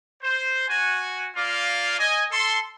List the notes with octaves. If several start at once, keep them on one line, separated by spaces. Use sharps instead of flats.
C5
F#4 G#5
A#3 F4 D5 F5
D#5 G#5
A4 C6